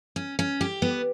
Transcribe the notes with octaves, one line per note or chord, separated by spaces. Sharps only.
C#4
C#4
G4
B3